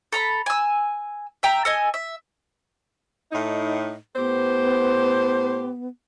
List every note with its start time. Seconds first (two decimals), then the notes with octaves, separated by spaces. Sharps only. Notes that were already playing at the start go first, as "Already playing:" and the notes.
0.13 A4 A#5 B5
0.46 G#5 E6
1.43 E5 G5 A#5
1.65 A4 D#5 G#5
1.94 E5
3.32 A2 D#4
4.16 A2 B3 G4 C5